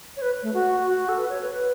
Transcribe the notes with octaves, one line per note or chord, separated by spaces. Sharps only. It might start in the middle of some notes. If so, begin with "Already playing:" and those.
C#5
B4
A3
F#4
F#4
A4
B4
C#5
B4
B4